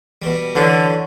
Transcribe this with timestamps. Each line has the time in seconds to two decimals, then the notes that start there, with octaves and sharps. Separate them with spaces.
0.22 B2 G3
0.55 D3 E3 F#3 C#4